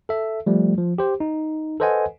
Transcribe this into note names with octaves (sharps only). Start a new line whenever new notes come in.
A4 E5
F3 G3 A3
F3
G4 C5
D#4
A4 B4 C5 D#5 F#5 G#5